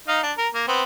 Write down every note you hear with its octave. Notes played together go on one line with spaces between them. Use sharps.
D#4 F5 A#5
D4
A#4
A#3
B3 C4